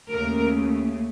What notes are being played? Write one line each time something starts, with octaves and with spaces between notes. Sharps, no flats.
D#2 C#3 A3 A#4